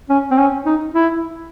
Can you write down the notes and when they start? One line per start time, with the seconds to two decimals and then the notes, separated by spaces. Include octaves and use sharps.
0.09 C#4
0.31 C4
0.38 C#4
0.66 D#4
0.94 E4